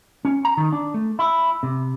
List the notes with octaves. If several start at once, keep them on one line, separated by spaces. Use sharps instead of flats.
C#4
A#5
D#3
D4
A3
E4
C3